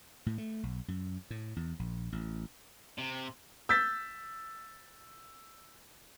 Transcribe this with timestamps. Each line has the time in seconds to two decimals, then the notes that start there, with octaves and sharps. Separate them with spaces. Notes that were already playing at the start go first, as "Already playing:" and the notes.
0.26 A2
0.38 A3
0.63 B1
0.88 F#2
1.30 A2
1.56 E2
1.79 A#1
2.12 A1
2.98 C3
3.69 E6 G6 A6 B6